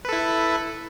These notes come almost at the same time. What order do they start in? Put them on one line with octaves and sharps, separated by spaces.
B4 A4 E4